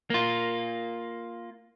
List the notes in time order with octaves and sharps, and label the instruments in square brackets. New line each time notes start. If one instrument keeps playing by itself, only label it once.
[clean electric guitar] A#3 F4